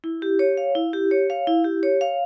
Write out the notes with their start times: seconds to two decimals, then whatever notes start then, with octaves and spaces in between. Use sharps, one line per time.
0.04 E4
0.22 G4
0.39 C#5
0.57 F5
0.75 E4
0.93 G4
1.11 C#5
1.30 F5
1.47 E4
1.65 G4
1.83 C#5
2.01 F5